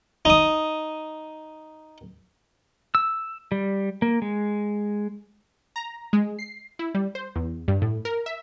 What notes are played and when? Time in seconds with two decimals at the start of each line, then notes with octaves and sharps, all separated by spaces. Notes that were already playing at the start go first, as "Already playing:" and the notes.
0.25 D#4 D#6
2.95 E6
3.52 G3
4.02 A#3
4.22 G#3
5.76 A#5
6.13 G#3
6.39 C7
6.79 E4
6.94 G3
7.15 C5
7.36 E2
7.68 G2
7.82 A2
8.05 A#4
8.26 E5